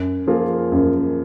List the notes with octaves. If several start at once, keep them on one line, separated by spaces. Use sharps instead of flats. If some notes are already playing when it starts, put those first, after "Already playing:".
Already playing: F#2
F3 A#3 F4 G#4
F#2